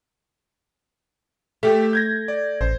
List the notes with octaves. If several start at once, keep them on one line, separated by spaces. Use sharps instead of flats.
A3 G4 A4 E5
G6 G#6 A#6
D5
A1 C5